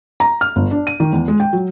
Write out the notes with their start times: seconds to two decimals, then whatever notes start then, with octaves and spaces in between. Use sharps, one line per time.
0.20 A#5
0.41 F6
0.56 G1
0.71 D4
0.87 D#7
1.00 D#3
1.13 E2
1.28 G#3
1.40 G5
1.53 F#3